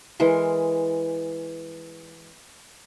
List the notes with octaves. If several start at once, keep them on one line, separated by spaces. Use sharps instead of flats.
E3 G#3 A#4 C6